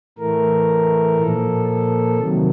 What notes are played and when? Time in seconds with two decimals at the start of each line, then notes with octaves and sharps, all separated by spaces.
0.19 A2 E3 A3 A#4
1.17 A#2 F3 A#3 A4
1.68 A4
2.17 C3 D#3 F#3